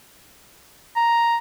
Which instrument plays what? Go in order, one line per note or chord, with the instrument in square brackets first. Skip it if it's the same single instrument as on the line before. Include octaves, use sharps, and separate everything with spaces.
[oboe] A#5